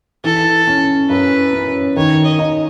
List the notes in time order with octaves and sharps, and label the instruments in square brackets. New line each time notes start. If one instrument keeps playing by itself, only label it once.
[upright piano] E3 [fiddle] A4
[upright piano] C#4
[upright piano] F#2 [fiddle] B4
[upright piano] C#4
[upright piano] D#3 [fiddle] C#5
[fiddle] D#5
[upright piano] D#4